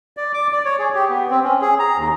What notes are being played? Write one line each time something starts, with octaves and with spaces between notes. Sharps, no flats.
D5
D6
D5
C#5
G#4
G4
B3
C4
C#4
G#4
A#5
D#2